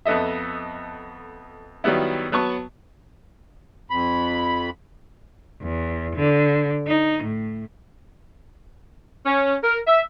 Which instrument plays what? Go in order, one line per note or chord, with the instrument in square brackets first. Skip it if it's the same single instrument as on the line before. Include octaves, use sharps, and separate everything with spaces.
[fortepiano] F2 B3 A4 D#5 E5
D#3 F#3 G3 B3 E4
F#3 B3 A5 C#6
[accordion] F2 B5
[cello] E2
D3
D#4
A2
[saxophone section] C#4
A#4
E5